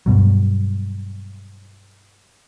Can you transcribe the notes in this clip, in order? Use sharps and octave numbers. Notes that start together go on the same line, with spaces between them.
G2 B2 F#3